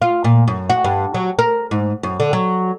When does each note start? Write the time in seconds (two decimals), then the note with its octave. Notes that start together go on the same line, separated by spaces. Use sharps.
0.02 F4
0.24 A#2
0.48 F#2
0.70 F#4
0.84 G2
1.14 F#3
1.39 A#4
1.71 G#2
2.03 F#2
2.20 D3
2.33 F#3